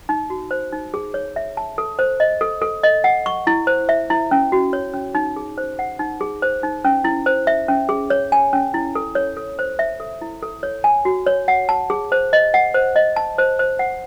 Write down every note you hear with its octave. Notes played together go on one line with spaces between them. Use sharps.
D#4
F#4
C5
D#4
G#4
C#5
E5
A5
A4
C5
D#5
A4
A4
D#5
F#5
C#6
E4
C5
E5
E4
C#4
F#4
C#5
C#4
D#4
G#4
C5
F#5
D#4
G#4
C5
D#4
C#4
E4
C5
E5
C#4
G#4
C#5
G#5
C#4
E4
A4
C#5
A4
C5
E5
A4
E4
A4
C#5
G#5
F#4
C#5
F#5
A5
G#4
C5
D#5
F#5
C5
D#5
A5
C5
C5
F#5